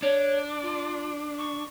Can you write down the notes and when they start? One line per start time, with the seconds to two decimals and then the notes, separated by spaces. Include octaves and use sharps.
0.02 D4 C#5
0.62 F4
1.38 C#6